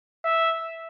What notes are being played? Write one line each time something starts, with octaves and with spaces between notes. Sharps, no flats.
E5